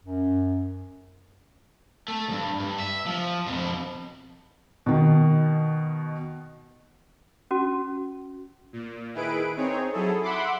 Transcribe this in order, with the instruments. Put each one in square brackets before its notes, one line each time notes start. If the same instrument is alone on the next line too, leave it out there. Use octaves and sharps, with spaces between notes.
[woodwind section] F#2
[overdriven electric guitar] A3
D2 G2
G2
E5
F3
F2 B2
[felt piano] B2 D#3
[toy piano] C#4 F#4
[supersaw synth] A#2
D#3 E4 G#4 B4 D7
C4 D#4 G#4 C#5
F#3 E4 G#4 A4
E5 F#5 B5 C6 D6